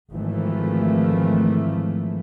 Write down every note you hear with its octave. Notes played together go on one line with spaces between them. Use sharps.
G#1 E3 F3 A3